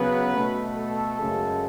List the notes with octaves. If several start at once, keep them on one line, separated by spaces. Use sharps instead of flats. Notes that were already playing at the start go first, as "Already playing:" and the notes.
Already playing: C#3 F#3 B3 B4
B2 A3
A4
F#2 C#3 G#3